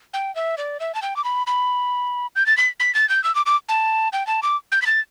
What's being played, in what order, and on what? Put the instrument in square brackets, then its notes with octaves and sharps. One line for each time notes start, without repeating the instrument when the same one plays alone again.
[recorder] G5
E5
D5
E5
A5
G5
D6
B5
B5
G6
A6
B6
B6
A6
G6
E6
D6
D6
A5
G5
A5
D6
G6
B6
A6